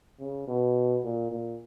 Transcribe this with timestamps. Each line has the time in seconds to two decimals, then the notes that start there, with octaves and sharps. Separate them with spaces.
0.20 C#3
0.47 B2
1.04 A#2
1.31 A#2